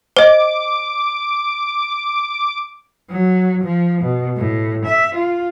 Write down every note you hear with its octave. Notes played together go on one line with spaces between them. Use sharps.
C5 D#5 D6
F#3
F3
B2
A2
E5
F4